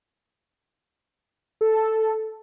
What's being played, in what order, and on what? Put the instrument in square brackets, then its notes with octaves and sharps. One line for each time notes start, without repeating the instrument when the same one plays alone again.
[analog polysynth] A4